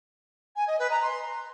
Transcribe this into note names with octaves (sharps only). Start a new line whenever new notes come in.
G#5
D#5
B4
A#5
C6